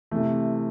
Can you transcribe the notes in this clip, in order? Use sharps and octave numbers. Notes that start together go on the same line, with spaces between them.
C3 E3 A3